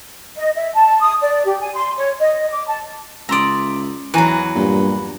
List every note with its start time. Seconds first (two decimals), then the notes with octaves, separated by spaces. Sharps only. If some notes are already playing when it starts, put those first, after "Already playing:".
0.38 D#5
0.56 E5
0.74 A5
1.01 D#6
1.21 D5
1.45 G4
1.61 G#5
1.75 C6
1.96 C#5
2.20 D#5
2.51 D6
2.67 A5
3.29 C#2 D5 E5 A#5 C6 D#6
4.14 E2 E3 F#3 B4 G#5 A#5
4.56 G2 A#2